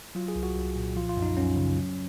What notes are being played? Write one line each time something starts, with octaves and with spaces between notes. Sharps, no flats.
F#3 F4
G#4
C2
F#4
C2
A#2
F3 F4
F4
F#2
D#4
F#2 C#4
C#3
F#3